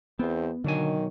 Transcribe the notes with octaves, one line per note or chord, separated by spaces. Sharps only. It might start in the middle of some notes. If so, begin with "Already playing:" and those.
E2 B3 C4
B1 D3 D#3 F#3 G#5